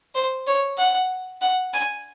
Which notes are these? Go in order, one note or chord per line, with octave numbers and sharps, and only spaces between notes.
C5
C#5
F#5
F#5
G#5